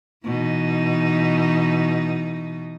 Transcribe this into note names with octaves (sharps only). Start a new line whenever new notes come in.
B2 E3 D#4